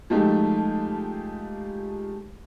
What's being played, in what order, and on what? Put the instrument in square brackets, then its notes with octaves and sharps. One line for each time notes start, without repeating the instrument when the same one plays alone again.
[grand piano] F3 G#3 A3 D#4 F4 G4